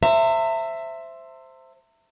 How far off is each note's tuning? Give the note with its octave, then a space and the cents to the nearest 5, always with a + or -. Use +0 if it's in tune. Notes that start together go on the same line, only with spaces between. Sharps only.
C5 +0 E5 +10 A#5 -45